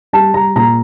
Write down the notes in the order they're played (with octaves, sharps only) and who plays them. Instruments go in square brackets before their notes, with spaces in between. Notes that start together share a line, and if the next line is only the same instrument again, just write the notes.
[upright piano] G3 A5
G3 A#5
A#2 A#5